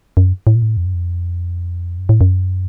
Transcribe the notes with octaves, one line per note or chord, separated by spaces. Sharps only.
F#2
A2
A#2
A2
F2
F#2
F2
F#2
A2
F#2